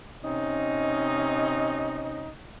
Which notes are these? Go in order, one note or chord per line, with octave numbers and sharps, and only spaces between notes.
C3 C#4 D#4